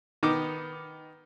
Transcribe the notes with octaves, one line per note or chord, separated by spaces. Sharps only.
D#3 B3 D#4 D6